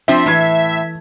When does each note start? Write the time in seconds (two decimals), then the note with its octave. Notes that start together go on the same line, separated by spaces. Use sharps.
0.08 F3 C4 D4 E5
0.26 A2 E3 G#6